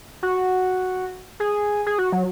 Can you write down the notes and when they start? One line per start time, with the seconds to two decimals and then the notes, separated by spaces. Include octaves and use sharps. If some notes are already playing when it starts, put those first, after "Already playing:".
0.23 F#4
1.40 G#4
1.86 G#4
1.98 F#4
2.12 F#3